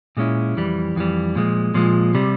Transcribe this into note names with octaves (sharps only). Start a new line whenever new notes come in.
A#2 G#3 C#4 E4
F2 E3 G3
F2 E3 G3
A#2 F3 G#3
A#2 F3 G#3
C3 G3